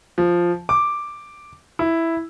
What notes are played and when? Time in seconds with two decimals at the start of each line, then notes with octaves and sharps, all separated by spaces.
0.18 F3
0.69 D6
1.79 E4